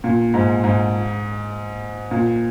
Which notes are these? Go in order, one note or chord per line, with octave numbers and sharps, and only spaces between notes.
A#2
G#2
G#2
A#2